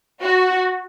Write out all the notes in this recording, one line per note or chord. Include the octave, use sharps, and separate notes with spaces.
F#4